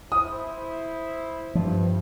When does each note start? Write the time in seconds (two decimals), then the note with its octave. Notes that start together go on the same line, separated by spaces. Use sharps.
0.12 E4 C5 D#6
1.55 G2 F3